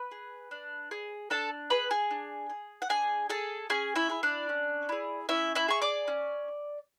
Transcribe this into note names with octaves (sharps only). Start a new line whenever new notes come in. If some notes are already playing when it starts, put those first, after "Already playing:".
Already playing: B4
G#4
D4
G#4
D4 A4 A5
G#4 B4 B5
G#4 G#5
D4
G#4
F#5
D4 G#4 G#5
G#4 A4 A5
C#4 G#4 G#5
E4 E5
E4 G#4
D4 D5
C#4
E4 G#4
C#4 E4 E5
E4 E5
G#4 C#6
D5 D6
C#4